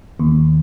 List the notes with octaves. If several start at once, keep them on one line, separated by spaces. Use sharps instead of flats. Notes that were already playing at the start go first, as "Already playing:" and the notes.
D#2